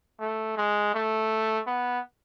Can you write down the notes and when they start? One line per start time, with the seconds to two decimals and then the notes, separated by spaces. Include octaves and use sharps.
0.20 A3
0.57 G#3
0.94 A3
1.67 B3